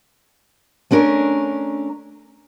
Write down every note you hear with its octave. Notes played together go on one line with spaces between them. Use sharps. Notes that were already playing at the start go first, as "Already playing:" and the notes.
A3 C#4 D4 A#4